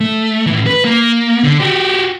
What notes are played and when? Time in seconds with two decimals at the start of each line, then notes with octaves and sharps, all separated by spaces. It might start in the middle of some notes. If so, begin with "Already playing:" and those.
0.01 A3
0.46 A2 E3
0.66 B4
0.85 A#3
1.44 D3
1.60 F#4 G4